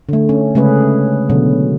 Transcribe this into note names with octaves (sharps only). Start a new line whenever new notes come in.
D3 A3
C#4
C#3 G#3 A3 C#4 G#4 B4
B2 D3 F#3